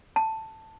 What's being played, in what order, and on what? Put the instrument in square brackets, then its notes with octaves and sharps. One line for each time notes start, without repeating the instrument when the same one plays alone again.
[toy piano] A5